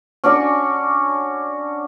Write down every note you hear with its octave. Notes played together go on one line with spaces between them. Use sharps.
C#4 D4 F#4 C#6